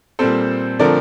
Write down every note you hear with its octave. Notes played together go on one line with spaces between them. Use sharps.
A#2 G3 C4 A4 C5
D3 F3 A3 C4 A#4 D5